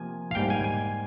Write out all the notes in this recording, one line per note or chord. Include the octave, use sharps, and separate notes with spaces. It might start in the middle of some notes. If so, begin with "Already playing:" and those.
Already playing: C3 F3 A#3 G#5
F5
G#2 G3 A#3 G5
G#5
G#5